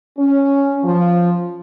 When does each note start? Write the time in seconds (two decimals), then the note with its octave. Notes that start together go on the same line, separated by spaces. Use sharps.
0.19 C#4
0.85 F3